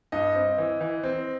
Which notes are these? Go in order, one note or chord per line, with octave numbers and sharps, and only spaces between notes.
G2 D#5
C4
E3
E3
C4